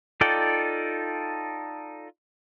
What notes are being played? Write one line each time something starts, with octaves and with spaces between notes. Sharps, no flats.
D#4 F4 A4 D5 G5